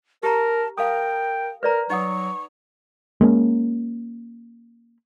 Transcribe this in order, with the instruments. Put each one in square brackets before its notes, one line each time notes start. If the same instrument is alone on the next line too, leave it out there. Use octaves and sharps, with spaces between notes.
[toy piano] G4 A#5 [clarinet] A#4 [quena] A5
[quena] A#4 [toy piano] F5 A5 D#6 [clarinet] G5
[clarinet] A#4 [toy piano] B4 D5 A#5
[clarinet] F#3 [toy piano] D#4 F#5 D#6 [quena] C#6
[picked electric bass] G#3 A#3 C#4